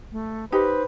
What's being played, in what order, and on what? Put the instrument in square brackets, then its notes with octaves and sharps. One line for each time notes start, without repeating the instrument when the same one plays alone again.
[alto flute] A3
[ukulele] D#4 G4 [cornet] B4 [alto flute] C5